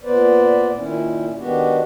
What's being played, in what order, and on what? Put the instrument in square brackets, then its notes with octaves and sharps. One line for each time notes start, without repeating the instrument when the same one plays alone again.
[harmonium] A#2 B3 B4 C5 D5
A#2 D#3 C#4 E4
D#3 G#3 B3 D4 F#4 G4